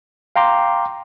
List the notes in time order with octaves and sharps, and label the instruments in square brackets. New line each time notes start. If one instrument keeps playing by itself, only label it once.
[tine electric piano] F5 G5 A#5 C6 D6